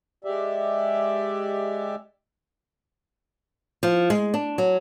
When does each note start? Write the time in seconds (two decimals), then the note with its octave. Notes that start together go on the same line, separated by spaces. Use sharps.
0.24 G#3 G4 D5 E5
3.83 F3
4.10 G#3
4.34 D4
4.58 F#3